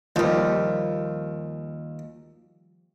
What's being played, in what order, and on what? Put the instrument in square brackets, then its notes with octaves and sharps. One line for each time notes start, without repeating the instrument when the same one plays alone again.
[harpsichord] D#2 [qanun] F3 G3